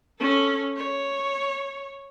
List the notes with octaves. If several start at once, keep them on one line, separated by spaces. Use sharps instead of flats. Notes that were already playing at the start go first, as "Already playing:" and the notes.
C#4 A4
C#5